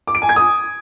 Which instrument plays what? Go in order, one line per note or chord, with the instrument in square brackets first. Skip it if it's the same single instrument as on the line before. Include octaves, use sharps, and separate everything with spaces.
[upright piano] D6
D7
G#5
G#6
D#6